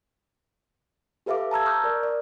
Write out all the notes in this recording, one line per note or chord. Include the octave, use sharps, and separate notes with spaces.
G4 A4 B4 E5 F5 D6
A5 A#5 E6 G#6
A#5 C#6 D#6 F6 G6
A#4 D5
D5